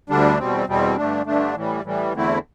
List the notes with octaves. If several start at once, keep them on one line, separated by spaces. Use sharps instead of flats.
D2 D3 G3 D4
E2 B2 G3 C4
E2 B2 G3 C4
G2 D3 A3 D4
G2 D3 A3 D4
A2 E3 G3
A2 E3 G3
E2 D3 A3 C4 E4